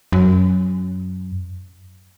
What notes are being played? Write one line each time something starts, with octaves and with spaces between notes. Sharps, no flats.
F#2